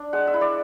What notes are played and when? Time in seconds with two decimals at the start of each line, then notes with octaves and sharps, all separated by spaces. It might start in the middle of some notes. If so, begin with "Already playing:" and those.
Already playing: D4
0.13 G#3 F#5
0.27 E5
0.34 E4
0.41 D5